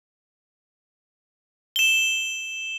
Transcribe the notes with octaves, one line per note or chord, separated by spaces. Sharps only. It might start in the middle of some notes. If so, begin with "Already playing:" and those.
E7 G7